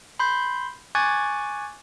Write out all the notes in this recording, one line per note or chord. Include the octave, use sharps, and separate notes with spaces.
B5 C6 G6
G#5 C#6 D6 F#6 G#6 A6